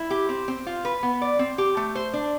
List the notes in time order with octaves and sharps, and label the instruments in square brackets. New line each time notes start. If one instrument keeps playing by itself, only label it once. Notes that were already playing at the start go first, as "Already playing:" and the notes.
Already playing: [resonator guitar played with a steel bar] E4
G4
C4
C4
F4
B4
B3
D5
C4
G4
A3
C5
D4